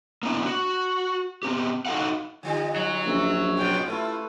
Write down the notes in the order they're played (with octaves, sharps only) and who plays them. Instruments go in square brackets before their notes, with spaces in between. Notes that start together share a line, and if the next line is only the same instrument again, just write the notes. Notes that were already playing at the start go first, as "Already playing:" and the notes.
[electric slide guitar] A#3 B3 D4 E4
F#4
B3 C4 G4
D#4 F#4 A4 F5 F#5
[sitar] D3 G3 D#4 [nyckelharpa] F4
[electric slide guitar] F#3
[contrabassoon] A#1 [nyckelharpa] C#4 E5
[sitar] G2 A#2 F4 [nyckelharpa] G5
[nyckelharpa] A3 B4 [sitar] E4 F4